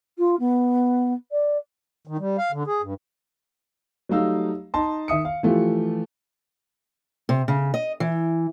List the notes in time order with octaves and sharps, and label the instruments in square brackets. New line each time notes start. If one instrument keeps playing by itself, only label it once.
[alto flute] F4
B3
D5
[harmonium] D#3
G3
F5
D3
G#4
G2
[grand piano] F#3 G3 A3 D#4 F5 E6
D#4 D#5 A5 C6
D#3 E5 D#6 C#7
F5
E3 F3 A3 F4 G4
[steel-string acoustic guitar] C3
C#3
D#5
E3